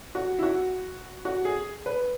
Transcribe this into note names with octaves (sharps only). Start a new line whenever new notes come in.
F#4
E4
F#4
F#4
G#4
B4